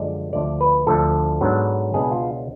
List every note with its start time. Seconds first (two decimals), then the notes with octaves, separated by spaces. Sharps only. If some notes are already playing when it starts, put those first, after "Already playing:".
Already playing: F#2 D3 F3 G#3 D4 D5
0.33 D2 D3 F3 A3 D5
0.61 B4
0.87 D2 D3 F3 A4
1.41 G#2 F#3 B3 D4
1.93 C#2 B2 G#3 B3 D4 G#4
2.12 F4